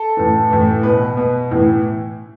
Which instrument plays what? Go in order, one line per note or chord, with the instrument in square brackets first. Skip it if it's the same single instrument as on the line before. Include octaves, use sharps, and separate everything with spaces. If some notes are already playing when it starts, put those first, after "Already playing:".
Already playing: [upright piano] A4
A2 E3
A2 E3
B2 B4
B2
A2 E3